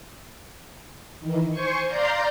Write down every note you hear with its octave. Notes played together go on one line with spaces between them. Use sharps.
D#3 E3
C5 G#5 C#6
D5 F5 A#5 C6 G6